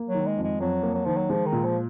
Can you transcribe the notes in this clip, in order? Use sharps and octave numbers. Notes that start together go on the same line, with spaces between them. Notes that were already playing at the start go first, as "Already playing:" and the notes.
Already playing: A#3
F#3
D#3
G#3
F2
G#3
F2 F#3
A#3
F#3
D#3 F3
F#3
F3 G#3
D#3
A#2
F3